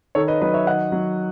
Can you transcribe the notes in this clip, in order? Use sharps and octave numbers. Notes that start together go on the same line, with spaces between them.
D#3 A4 C#5
B4 D#5
F#3 B4 D#5
C#5 E5
D#3 D#5 F#5
F#3